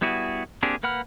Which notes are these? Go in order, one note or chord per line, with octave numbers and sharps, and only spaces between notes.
G3 B3 E4 F#4 G#4
A#3 C4 D4 G4 G#4
A#3 B4 F#5 B5 F6